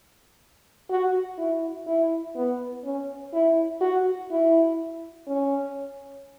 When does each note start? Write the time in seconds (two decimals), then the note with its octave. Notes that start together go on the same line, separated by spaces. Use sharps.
0.89 F#4
1.38 E4
1.87 E4
2.35 B3
2.84 C#4
3.33 E4
3.81 F#4
4.31 E4
5.27 C#4